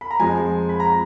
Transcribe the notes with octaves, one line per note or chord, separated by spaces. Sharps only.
B5
A#5
F2 F3 G#3 G#5
B5
A#5